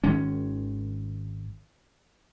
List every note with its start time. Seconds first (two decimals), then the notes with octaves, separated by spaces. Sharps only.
0.04 G#1 D#3 G#3 C#4